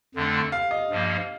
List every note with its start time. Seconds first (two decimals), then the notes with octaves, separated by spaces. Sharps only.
0.15 F2 D3 A3 D4
0.52 F5
0.71 D#5
0.90 G2 F3 A#3